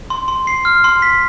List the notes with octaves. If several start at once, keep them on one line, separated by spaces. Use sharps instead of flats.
C6
C6
C7
F6
C6
B6